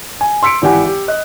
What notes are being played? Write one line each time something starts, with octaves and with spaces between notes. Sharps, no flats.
G#5
C6 E6 B6 C#7 D7
G#1 E3 G4 F#5 G#5
G4
D#5 F#6